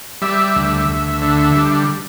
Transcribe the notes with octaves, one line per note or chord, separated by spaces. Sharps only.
G3 E5
D2
D2
D3
G3